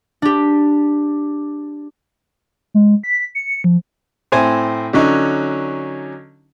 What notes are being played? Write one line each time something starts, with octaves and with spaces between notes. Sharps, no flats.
D4 G4
G#3
B6
C#7
F3
A2 C4 C5 G#5
D3 F#3 C#4 D#4